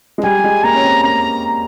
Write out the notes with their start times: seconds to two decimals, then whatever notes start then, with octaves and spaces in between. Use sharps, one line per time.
0.18 G#3
0.23 G3 G#5
0.44 G#3
0.64 A#3 A#5
0.74 C#4
0.84 C4
1.04 A#3 A#5